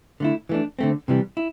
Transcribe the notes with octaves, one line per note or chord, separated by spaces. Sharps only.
D3 A3 E4
E3 A3 D4
D3 A3 C4
C3 E3 G3
E4